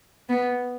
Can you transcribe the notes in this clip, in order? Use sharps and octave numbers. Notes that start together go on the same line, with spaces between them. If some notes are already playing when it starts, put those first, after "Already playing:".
B3